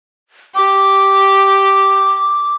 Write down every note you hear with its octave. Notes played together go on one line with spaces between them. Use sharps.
G4 D6